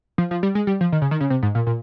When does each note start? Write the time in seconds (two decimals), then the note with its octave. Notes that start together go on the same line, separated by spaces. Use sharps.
0.18 F3
0.31 F3
0.43 G3
0.55 G#3
0.67 G3
0.81 F3
0.92 D#3
1.02 C#3
1.11 D#3
1.21 C#3
1.30 C3
1.42 G#2
1.55 A#2
1.67 A#2